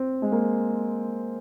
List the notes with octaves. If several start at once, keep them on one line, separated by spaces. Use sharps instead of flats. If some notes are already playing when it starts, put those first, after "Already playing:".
Already playing: C4
G#3
A#3